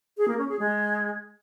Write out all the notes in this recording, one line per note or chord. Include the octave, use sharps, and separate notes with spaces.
G#4
A#3
C#4
G#4
G#3